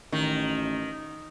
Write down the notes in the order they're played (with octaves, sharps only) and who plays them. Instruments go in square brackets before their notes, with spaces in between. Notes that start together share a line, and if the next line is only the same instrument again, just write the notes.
[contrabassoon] A1 [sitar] D#3